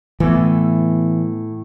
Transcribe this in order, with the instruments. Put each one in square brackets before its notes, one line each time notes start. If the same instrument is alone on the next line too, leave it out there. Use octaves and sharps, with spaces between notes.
[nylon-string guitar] A2 [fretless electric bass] E3 B3